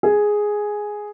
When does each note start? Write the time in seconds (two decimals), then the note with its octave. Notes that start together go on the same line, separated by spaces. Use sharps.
0.03 G#4